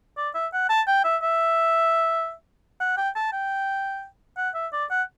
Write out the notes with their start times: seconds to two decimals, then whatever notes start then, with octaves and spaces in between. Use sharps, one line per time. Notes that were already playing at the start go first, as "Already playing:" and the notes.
0.17 D5
0.35 E5
0.53 F#5
0.70 A5
0.87 G5
1.05 E5
1.23 E5
2.80 F#5
2.97 G5
3.16 A5
3.33 G5
4.37 F#5
4.55 E5
4.73 D5
4.91 F#5